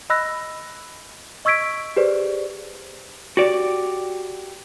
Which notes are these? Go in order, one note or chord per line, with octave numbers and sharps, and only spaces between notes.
D#5 B5 E6 F#6 A#6
D#5 C#6 E6 G#6 B6 D7
G4 G#4 B4 C5 D5
F#4 G4 D5